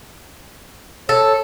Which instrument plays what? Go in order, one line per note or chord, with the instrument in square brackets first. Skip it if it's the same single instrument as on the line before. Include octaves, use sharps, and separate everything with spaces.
[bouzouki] A4 [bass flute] C#5